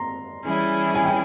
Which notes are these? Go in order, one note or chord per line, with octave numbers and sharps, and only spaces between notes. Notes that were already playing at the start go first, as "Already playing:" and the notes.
Already playing: A#5 C6
E3 G3 C#4 E4 G#4
G#5
G5